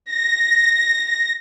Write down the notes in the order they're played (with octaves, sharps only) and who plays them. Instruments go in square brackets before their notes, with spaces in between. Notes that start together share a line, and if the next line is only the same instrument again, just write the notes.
[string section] A#6